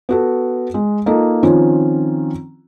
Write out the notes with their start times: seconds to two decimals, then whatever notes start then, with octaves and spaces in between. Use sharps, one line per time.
0.09 B3 F#4 A4
0.74 G#3
1.06 A#3 D#4 F4 A4 D#5
1.43 D#3 F3 C4 C#4 F4